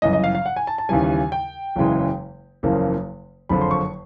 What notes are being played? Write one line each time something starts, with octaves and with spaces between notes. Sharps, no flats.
G1 F#2 C#3 E3 D#5
D#5
F5
F5
F#5
G#5
A5
A5
D#2 C#3 E3 G3 G#5
G5
F#1 E2 C#3 E3 G#3
F#1 E2 C#3 F3 A#3
F#1 F2 D3 F3 B5
C6
C#6